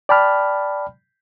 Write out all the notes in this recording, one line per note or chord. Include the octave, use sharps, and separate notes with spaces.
D5 G5 A5 B5 F6